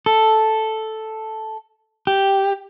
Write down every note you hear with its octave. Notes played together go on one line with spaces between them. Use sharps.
A4
G4